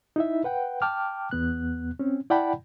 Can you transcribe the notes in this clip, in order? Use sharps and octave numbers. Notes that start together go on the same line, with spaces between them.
D#4 E4 E5
B4 F#5 G5
G5 A5 D6 F6
E2 B3 F#6
C4 C#4
E4 D5 F#5 G5 A5 B5